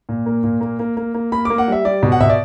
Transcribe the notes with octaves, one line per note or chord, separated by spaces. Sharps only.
A#2
A#3
A#2
A#3
A#3
A#3
A#3
A#3 B5
A#3 D6
F#5
G3 E5
G3 D5
B2
F#5
B2 E5
D5